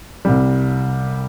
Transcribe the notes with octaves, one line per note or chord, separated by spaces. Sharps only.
C2 C3 G3